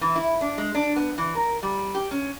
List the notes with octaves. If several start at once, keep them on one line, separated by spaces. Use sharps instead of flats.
E3
E4
D4
G#3
D4
B3
E3
A#4
G3
G4
C#4